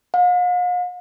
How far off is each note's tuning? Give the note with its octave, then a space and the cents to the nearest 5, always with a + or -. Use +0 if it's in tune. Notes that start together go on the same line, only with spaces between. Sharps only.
F5 +45